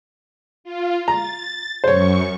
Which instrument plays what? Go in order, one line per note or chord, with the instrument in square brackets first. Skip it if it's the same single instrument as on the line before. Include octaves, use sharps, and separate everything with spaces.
[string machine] F4
[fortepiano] A#5 [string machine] A6
[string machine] F#2 C#6 [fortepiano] C5 C#5